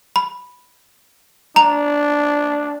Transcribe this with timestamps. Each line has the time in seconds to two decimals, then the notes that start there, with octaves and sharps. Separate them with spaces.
0.16 B5
1.56 D4 A#5 F7